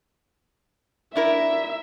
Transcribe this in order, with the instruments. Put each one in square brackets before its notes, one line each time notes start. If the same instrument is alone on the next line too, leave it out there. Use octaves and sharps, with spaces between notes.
[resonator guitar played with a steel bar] D4 E4 A#4 [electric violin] E5